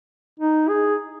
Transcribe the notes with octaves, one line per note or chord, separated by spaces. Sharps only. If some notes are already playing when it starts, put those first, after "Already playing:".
D#4
G#4